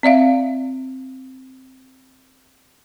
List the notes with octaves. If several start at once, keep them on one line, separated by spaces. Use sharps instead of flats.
C4 D5 E5 F5